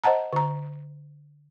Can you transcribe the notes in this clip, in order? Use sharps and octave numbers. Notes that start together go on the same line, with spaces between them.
C5 D#5 F#5 A5 A#5
D3 A#5